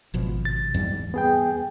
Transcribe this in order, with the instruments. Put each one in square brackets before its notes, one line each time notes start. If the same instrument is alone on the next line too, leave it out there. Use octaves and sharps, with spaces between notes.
[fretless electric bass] G#1 B2 F3
[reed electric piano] A6
[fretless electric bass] E2 G#2 G3
[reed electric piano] B3 G#4 G5